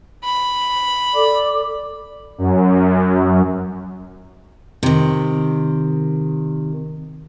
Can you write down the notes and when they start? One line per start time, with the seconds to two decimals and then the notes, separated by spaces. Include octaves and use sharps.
0.25 B5
1.14 A4 D5 D6
2.38 F#2
4.83 C3 D#3